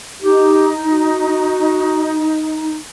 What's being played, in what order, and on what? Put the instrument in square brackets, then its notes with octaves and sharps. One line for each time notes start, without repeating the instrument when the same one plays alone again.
[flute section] D#4 [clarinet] G4
[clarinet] F#4